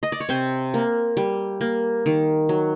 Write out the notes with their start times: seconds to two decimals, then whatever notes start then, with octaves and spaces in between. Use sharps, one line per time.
0.03 D#5
0.12 D5
0.20 C#5
0.29 C3 C4 C5
0.74 A#3
1.17 G3
1.61 A#3
2.06 D#3
2.49 F#3